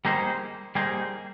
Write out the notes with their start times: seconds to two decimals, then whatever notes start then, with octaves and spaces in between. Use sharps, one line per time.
0.05 G3 A#3 D#4 G#4 C5
0.75 G3 A#3 D#4 G#4 C5